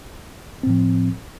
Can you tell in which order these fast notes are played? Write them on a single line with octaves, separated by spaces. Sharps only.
C4 A2 F3